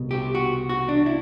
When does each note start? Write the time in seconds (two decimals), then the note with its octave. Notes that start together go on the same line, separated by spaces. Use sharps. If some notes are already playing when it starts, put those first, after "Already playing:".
Already playing: C2 B2
0.11 G4
0.35 F#4
0.69 F#4
0.89 D4
1.06 E4